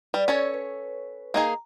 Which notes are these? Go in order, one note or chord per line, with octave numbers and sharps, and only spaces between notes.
G3 B4 D5
C#4 A4 C#5
B4
A#3 D#4 G#4 A#5